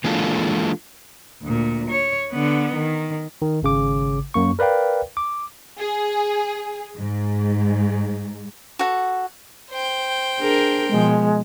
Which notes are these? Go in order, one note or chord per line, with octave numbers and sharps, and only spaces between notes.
E3 G#3 A#3 D4 F4 A4
D2 A#2
C#5
D3 B3
D#3
D#3
G#1 C#3 D6
F#2 A#3 C#6
A#4 B4 D5 F5 G5
D6
G#4
G#2
F#4 A4 F#5
C5 G5
D4 G#4 A#4
B2 F3 G#3